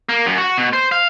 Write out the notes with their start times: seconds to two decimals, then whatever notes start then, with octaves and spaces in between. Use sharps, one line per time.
0.09 A#3
0.26 F#2
0.38 F#4
0.58 B2
0.73 C5
0.92 F5